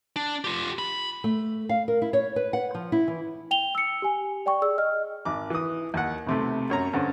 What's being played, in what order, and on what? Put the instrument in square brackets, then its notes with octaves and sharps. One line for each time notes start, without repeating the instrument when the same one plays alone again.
[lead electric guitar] D4
F4 G4
B5
[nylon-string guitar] A3
F5
A#4
E4
C#5
B4
F#5
F3
E4
E3
[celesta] G5 F7 G7
E6 C#7
G4 G#5
D5 G5 C#6
G#4 D5 E6
D#5 F6
[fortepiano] G#1 D6
E3 D#6
D#2 F#5
B1 C3 A3
F#2 C#5 A#5
G2 D3 C4 C#4